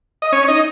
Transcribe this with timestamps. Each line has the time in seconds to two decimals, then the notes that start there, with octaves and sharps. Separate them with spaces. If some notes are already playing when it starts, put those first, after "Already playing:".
0.22 D#5
0.32 C#4 C#5
0.48 D#4 D#5